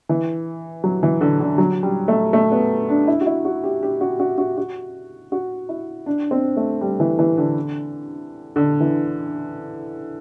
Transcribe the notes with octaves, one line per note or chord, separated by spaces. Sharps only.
E3
F#3
E3
D3
D3
F#3
G3
A3
A3
B3
D4
E4
F#4
E4
F#4
G4
G4
F#4
F#4
F#4
F#4
F#4
E4
D4
C4
A3
G3
E3
E3
D3
D3
E3